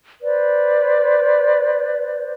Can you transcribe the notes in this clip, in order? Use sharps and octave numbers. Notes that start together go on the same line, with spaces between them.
B4 C5 D5